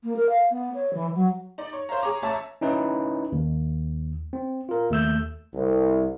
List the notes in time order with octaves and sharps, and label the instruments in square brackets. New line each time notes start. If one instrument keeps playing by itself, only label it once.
[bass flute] A#3
A#4
F5
B3
C#5
E3
F#3
[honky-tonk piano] D#4 D5
C#5
C5 C#5 F5 A#5
G#4 C#5 A#5 D6
A1 C#5 E5 A5 A#5
[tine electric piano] C#4 D#4 E4 B4
D#2
C4
F4 A#4
D#2 A3 E6 G6
[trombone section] C2